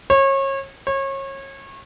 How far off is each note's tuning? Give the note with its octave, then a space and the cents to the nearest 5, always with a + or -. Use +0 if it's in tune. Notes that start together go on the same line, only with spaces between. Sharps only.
C#5 -30
C#5 -30